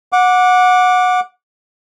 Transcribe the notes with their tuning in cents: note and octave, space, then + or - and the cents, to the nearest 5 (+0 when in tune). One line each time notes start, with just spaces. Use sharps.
F#5 -20 D6 -5